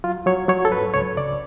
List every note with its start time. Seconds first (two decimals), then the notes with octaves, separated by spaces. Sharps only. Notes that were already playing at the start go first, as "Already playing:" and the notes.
0.04 F#3 F4
0.26 F#3 C#5
0.48 F#3 C#5
0.65 A4
0.72 G#2 B4
0.94 C#2 C#5
1.17 C#3 D5